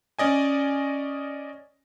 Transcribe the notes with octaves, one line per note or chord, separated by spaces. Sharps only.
C#4 D5 D#5 G#5